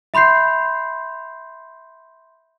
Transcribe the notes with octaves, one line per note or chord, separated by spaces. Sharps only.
E5 B5 C6 G6 C7